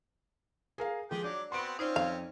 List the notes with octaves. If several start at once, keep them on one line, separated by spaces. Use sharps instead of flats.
G#4 A#4 F5
F3 G#3 G4 G#4 G5
F#3 D4 D6
B3 C4 F#4 C6 D7
C4 C#4 D#4 F4 C5 D5
F2 F5